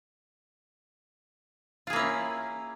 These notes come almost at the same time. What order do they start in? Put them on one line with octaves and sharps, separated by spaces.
F4 G#4 A#3 E4 C#4